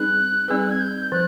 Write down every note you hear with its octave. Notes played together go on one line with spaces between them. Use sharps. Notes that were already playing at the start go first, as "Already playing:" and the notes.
Already playing: G3 C4 D#4 G#4 B4 F#6
G3 C4 D#4 G#4 B4 E6
F#6
G#6
G6
F3 F#6